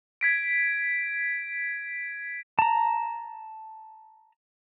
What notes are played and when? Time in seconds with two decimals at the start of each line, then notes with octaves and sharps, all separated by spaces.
0.21 G#6 B6 D7
2.59 A5 A#5